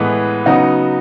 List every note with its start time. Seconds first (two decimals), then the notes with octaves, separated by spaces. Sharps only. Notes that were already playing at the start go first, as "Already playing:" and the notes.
Already playing: A2 E3 G#3 B3
0.46 C#3 F#3 B3 D#4 F#4